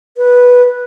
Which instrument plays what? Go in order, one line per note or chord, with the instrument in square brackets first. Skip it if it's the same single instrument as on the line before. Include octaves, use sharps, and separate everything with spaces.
[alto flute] B4